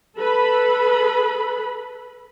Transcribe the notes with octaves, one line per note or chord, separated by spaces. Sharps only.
A4 B4 B5